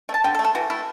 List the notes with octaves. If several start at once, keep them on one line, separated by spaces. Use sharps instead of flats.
A3
A5
D3 G5
A4
A3
A4
E3 F#4
A3 E4